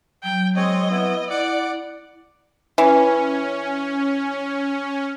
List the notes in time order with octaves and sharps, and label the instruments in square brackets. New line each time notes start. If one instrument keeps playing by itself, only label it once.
[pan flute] F#3 [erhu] G5
[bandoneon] G#3 C4 C#5 [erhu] D#5
[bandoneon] B3 E4
[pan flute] E4 [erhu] D5 [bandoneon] F#5 D6
[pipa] E3 [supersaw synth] C#4